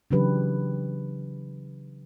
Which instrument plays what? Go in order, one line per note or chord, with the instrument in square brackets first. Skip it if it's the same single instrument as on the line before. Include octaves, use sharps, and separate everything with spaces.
[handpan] C#3 E3 F#3 D4 G4 B4